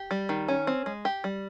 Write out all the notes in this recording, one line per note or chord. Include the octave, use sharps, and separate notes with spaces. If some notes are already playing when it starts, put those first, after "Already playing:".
Already playing: G4
G3
D#3
C#4
C4
G#3
G4
G3